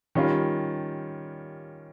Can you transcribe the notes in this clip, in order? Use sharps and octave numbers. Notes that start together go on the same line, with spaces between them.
D#3 G3 C#4 F4